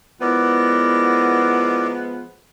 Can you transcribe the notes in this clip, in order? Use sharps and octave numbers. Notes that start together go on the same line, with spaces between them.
F3 G#3 B3 E4 A#4 D5